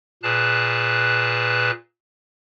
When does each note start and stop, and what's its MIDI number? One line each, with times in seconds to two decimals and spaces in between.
0.23 1.71 46
0.23 1.71 68
0.23 1.71 71
0.23 1.71 81
0.23 1.71 90